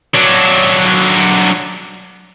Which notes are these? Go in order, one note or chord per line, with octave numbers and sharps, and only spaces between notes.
F#3 D4